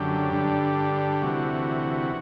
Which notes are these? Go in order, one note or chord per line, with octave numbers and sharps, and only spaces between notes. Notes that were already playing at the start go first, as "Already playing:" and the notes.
Already playing: F#2 D3 G4
G2 D3
D2 C3 E3 F#4